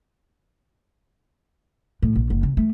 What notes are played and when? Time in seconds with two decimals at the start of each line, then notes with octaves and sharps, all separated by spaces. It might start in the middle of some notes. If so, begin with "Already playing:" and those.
2.02 A2
2.15 A#1
2.30 F#1
2.43 C#3
2.57 A3